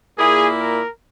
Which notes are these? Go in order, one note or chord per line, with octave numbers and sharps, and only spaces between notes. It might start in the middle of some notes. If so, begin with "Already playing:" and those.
A#2 A#3 E4 G#4
A#4